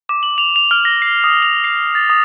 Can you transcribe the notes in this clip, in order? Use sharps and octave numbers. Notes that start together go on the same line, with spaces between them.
D6
F#7
F7
F7
F6
A#6
C7
D#6
F7
C7
A6
D#6